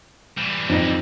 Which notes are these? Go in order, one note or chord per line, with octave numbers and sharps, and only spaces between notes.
E3 G3
F2 D#4 A#6